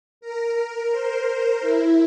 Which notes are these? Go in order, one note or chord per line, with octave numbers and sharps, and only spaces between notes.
A#4
C5
E4